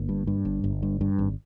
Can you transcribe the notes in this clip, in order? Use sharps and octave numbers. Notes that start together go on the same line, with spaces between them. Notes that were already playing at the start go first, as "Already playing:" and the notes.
Already playing: G1 A#3
G2
G2
G1
G1
G2
G2
G#1